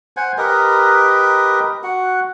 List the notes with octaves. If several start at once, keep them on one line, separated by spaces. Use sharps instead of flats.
C5 F#5 G#5
G4 A#4 B4 D#5
F#4 F#5